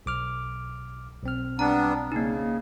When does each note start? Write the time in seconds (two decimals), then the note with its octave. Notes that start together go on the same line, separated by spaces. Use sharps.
0.06 B1 D6 F6
1.23 B1 C4 F6
1.59 G3 B3 D4 A#5
2.12 C#3 A#3 D#4